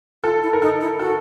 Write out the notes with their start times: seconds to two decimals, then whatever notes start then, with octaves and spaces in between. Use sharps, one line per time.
0.23 F4 A4
0.43 E4
0.53 A#4
0.62 D#4 A4
0.81 E4
0.99 F#4 A4